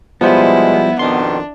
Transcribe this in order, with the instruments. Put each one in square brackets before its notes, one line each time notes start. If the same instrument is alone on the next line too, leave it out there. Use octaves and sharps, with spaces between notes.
[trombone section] B2 G#3 [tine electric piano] F3 G3 C5 [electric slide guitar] B3 [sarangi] E4
[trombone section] F2 B2 D#3 [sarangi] D4 [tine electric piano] C6